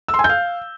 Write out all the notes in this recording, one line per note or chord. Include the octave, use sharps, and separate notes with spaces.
E6
C6
G#5
G6
F5